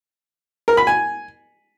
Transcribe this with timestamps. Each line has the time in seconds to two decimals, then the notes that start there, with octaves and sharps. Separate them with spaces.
0.68 A#4
0.77 B5
0.87 G#5